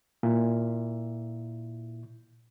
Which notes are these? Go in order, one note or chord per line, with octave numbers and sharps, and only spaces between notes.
A#2 E4